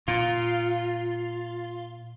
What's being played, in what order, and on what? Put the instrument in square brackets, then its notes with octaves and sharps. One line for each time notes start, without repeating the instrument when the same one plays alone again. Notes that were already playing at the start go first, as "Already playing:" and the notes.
[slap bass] A#2 [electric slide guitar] F4